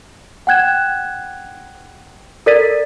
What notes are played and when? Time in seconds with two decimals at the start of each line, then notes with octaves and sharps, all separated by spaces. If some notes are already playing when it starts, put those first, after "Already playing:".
0.47 F#5 G5 F#6 G#6 E7
2.46 A4 A#4 D5 A6 B6 D#7